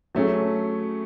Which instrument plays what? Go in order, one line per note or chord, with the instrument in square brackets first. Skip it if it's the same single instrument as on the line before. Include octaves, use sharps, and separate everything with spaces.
[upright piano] F#3 A3 C#4 G#4